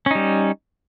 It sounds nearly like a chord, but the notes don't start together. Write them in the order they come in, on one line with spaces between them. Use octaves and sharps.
C#4 D#4 G3